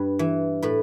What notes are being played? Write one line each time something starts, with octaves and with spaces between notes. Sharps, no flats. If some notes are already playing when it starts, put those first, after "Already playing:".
Already playing: G2 B4
E3
A2 B4